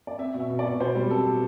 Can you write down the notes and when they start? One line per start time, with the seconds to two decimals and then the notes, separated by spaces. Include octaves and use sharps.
0.07 D5
0.18 C4 E5
0.34 B2
0.40 E5
0.50 B2
0.59 D5
0.65 B2
0.80 B2 C5
0.95 G3
1.10 C4 A4
1.26 B2